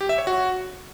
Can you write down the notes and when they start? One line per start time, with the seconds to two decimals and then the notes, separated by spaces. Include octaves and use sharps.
0.01 G4
0.09 E5
0.18 C#5
0.27 F#4